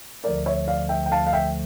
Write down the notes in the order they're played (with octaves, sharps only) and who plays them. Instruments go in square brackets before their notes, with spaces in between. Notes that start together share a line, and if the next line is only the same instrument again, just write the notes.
[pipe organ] D2 D3 F3 A3 [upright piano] A#4 D5
[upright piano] C#5 E5
D5 F5
E5 G5
G5
F5 A5
F5
E5 G5